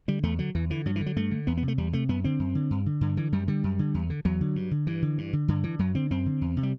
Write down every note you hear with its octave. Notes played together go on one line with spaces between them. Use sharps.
D3 G3
E2 A3
D3 F#3
E2 E3
D3 E3
G2 F#3
E3
D3
F#3
G2 A3
D3
E2 B3
B3
C3
A3
E2 G3
C3 A3
F#2 B3
D3 C4
F#2
D3
G2
D3
G2 D3
D3 E3
F#2 G3
D3 G3
F#2
D3
E2
D3
E2 F#3
D3
G2
D3
G2 E3
D3
G2
D3
G2 D3
D3 E3
F#2 F#3
D3 C4
F#2 C4
D3
E2
C3
G3